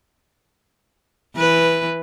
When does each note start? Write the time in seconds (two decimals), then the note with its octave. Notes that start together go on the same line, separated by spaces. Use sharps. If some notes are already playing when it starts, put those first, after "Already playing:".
1.36 E3 B4